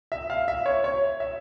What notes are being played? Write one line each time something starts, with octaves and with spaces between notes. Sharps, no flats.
E5
F5
E5
C#5
C#5
E5